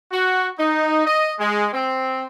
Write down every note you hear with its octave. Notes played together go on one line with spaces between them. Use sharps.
F#4
D#4
D#5
G#3
C4